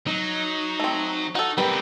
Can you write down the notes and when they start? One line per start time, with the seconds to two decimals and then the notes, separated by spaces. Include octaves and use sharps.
0.07 F#3 D#4
0.80 A3 C4
1.35 D#4 F#4 A4
1.58 G3 B3 C4 G4 A#4 B4